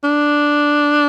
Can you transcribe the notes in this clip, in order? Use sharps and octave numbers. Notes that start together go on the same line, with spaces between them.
D4